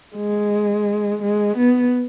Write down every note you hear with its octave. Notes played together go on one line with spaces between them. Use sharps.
G#3
G#3
B3